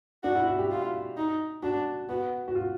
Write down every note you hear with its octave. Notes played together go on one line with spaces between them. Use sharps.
D4 F#4
E4
F#4
G4
F4
D#4
D4 F#4
B3 F#4
F#4
F4